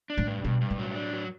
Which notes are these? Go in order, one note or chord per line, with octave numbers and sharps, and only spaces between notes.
D4
A2
G2
G2 B2
G2
A2
F#3
D4
F#3